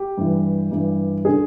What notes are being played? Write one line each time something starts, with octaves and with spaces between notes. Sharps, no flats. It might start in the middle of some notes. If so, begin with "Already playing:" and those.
Already playing: G4
G2 E3
G2 E3
D3 G#4